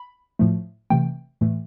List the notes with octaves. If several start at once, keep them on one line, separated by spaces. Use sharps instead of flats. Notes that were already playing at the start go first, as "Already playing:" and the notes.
Already playing: B5
A2 F3 A3
C3 E3 A3 G5
A2 E3 A3